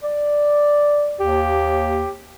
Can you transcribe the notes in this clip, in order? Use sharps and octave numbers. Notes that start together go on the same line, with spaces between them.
D5
D#2 G4